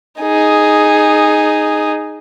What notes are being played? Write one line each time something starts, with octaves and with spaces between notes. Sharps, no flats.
D#4 G#4